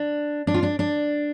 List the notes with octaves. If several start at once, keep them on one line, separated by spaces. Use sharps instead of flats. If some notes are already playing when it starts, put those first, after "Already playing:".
Already playing: D4
D4
F4
D4
D4